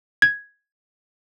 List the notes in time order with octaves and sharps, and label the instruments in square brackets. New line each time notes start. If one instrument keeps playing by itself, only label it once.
[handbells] G#6